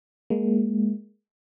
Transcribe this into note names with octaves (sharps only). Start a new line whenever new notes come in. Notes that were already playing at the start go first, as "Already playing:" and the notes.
G#3 A#3